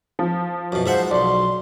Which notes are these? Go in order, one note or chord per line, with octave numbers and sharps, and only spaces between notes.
F3
F#2 B2
G#2 C5 E5 F#5
B1 D5 C6